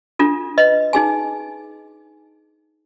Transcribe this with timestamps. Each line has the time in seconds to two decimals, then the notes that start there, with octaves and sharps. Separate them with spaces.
0.19 D4 F4 A4
0.58 B4 D#5
0.93 D#4 G#4 G#5